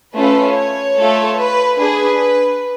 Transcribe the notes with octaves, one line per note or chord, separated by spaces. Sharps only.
A3 C#4 F4 B4
C#5
A3 F4 A4
B4
D4 G#4 B4